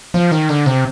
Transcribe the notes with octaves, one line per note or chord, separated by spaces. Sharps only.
F3
D#3
D3
C3